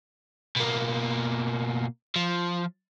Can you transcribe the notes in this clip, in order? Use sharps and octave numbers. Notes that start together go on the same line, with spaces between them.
B2 A#3
F3